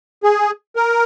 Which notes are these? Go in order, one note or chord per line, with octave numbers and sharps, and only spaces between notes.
G#4
A#4